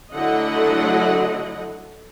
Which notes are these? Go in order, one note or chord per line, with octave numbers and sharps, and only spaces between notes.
D3 F#3 A3 E4 D#5 F#5